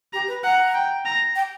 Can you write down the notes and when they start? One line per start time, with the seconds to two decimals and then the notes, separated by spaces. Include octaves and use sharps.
0.13 G4 A#5
0.28 B4
0.44 F#5 A#5
0.75 G5
1.05 A#5
1.35 G5